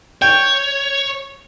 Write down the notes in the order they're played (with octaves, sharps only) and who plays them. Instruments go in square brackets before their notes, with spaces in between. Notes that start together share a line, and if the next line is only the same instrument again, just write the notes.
[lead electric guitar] C#5 [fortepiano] G5